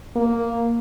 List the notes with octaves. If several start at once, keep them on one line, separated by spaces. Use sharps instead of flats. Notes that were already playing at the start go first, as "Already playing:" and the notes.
A#3